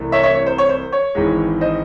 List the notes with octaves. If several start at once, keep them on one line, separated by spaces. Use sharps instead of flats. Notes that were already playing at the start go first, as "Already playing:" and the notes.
Already playing: C2 C3 E3 A3
C#5 E5
C#5 E5
C#5
C5
C#5
C5
C#5
G#1 G#2 E3 G#3
C5 D#5